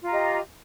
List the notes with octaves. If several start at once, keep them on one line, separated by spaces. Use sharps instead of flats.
F4 G4 D#5 A#5